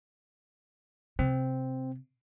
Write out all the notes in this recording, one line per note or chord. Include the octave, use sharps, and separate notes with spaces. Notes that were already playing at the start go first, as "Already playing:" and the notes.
C3 C4